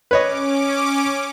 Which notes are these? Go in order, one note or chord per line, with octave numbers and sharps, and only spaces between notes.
C#4 B4 C#5 D#5 D6